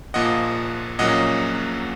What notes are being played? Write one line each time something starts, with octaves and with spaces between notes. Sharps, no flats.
A#1 A#2 F3 A#3 D#5 F#5
A#1 A#2 F#3 A#3 C#4 D#5 F#5